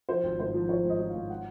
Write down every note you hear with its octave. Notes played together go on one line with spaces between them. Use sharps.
F3 C5
G#1
G#2 C5
F3
F3 C#5
G#2
D#5
F3
G#2 F5
F#5